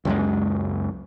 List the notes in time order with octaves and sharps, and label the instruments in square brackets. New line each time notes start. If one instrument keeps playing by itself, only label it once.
[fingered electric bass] C#2 F#2 G#3